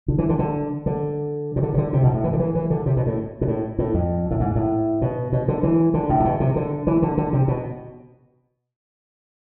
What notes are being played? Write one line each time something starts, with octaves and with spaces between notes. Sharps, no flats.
D3
E3
D3
D3
D3
C3
D3
C3
D3
C3
B2
A2
E3
D3
E3
E3
D3
C3
B2
A2
B2
A2
A2
F2
A2
G#2
A2
B2
B2
D3
E3
D3
A2
C3
B2
C3
D3
E3
D3
D3
C3
B2